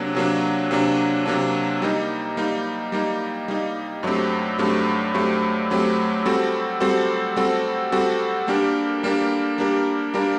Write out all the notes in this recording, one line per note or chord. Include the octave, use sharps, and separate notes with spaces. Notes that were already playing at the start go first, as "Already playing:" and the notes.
Already playing: C3 F#3 A#3 D4
C3 F#3 A#3 D4
C3 F#3 A#3 D4
C3 F#3 A#3 D4
G3 A#3 D#4
G3 A#3 D#4
G3 A#3 D#4
G3 A#3 D#4
G2 F#3 A3 C4 G4
G2 F#3 A3 C4 G4
G2 F#3 A3 C4 G4
G2 F#3 A3 C4 G4
G3 C4 F#4 A4
G3 C4 F#4 A4
G3 C4 F#4 A4
G3 C4 F#4 A4
G3 A#3 D4 G4 A#4
G3 A#3 D4 G4 A#4
G3 A#3 D4 G4 A#4
G3 A#3 D4 G4 A#4